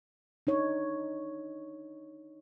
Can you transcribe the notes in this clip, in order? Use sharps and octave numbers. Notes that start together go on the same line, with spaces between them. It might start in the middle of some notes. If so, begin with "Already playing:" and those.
D4 D#4 C#5